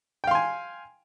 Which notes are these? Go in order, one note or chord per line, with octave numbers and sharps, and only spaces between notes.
F5 G5 G#5 C6